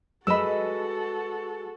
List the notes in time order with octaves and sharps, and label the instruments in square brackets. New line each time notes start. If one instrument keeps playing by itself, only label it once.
[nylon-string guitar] G#3 B4 D#5 [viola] F#4 A4 [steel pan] B5 E6